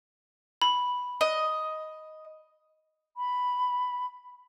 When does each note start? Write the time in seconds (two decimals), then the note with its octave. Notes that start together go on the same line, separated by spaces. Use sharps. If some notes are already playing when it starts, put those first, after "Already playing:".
0.62 B5
1.21 D#5
3.17 B5